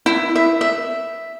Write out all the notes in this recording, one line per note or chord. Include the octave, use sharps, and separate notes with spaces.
E4
E5
E5